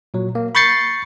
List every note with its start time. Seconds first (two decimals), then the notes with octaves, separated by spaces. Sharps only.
0.14 A#2 F#3
0.35 A#3
0.55 B5 C#6 G6 A6 C7 C#7